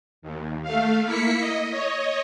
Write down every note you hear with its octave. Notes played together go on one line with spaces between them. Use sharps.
D#2
A3 F5
A#3 E4 B6 C#7
D#5
C#5 D#5